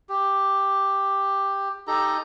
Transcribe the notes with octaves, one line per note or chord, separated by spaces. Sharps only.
G4
D#4 G4 A4 A#5